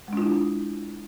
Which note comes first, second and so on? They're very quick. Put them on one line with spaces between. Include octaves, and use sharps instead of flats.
G#3 D4 F4 E4